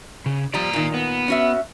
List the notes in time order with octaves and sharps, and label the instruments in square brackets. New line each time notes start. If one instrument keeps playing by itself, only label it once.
[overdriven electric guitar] C#3
[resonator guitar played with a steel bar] F3 G3 [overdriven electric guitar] D5 A#5
[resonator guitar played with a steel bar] A#2 D#3
[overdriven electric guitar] B3
[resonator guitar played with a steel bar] C#4 F#4 E5